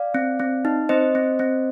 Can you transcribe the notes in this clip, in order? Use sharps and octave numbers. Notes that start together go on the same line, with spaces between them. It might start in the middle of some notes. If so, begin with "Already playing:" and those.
Already playing: D5 F5
C4
C4
D#4
C4 C5 D#5
C4
C4